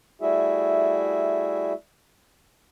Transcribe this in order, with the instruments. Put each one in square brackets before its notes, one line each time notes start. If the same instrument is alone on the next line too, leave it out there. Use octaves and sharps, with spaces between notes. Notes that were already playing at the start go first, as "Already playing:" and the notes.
[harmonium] G3 A3 E4 F#4 G#4 E5